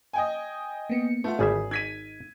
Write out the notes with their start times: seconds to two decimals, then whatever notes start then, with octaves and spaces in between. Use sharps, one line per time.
0.13 D#5 G5 G#5
0.90 A#3 B3 C#7
1.24 A3 F4 B4 F#5
1.39 G#1 D3 G3 G#4 E5
1.71 D#4 G#6 B6 D#7